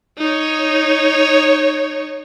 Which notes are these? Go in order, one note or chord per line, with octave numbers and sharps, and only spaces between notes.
D#4 C#5